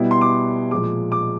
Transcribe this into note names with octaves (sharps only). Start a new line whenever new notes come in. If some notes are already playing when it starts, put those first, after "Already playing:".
Already playing: B2 G3 B3 E4
C6
D6
A#2 F3 G#3 D6
D6